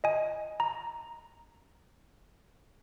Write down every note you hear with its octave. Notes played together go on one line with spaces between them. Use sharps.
D#5 G#5
A#5